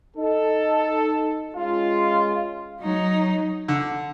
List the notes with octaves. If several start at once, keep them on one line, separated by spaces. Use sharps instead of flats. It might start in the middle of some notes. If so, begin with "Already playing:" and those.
D#4 A4
G#3 C#4 F4
F#3 D#4
D3